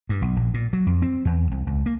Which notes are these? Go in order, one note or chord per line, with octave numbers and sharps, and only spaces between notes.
G2
B1
A#1
A#2
F#3
F2
C4
E2
C2
C#2
A#3